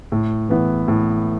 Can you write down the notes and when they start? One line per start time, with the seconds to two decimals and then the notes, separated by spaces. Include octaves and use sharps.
0.12 A2
0.49 E3 B3 E4
0.88 A2